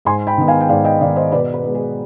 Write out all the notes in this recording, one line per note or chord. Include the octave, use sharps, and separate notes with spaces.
G#2 G#5 C6
G5 B5
D#3 B3
F5 G#5
G5
G#2 D5 F5
D#5 G5
D#3 B3 D5 F5
C5 D#5
B2 B4 D5
B4
G#3 B3
G#4